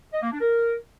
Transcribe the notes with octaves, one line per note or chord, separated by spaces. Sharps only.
D#5
A#3
D4
A#4